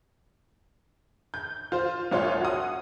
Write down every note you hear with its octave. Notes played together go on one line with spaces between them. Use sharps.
G6
F4 C5
C2 F4 C#5 C6
F#4 D#6